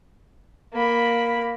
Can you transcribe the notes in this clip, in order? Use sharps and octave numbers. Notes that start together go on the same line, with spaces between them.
A#3 B5